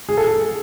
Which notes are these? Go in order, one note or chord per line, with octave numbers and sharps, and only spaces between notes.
G#4
A4
G#4